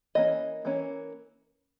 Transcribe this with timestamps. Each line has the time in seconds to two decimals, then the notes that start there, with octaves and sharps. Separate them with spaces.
0.15 E3 A#3 C#4 D#5
0.65 E3 A#3 C#4